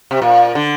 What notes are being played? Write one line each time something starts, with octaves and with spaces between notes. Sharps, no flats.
C3
A#2
D3